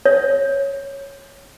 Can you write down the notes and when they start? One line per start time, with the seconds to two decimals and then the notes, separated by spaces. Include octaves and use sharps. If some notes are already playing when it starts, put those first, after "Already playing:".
0.06 C#5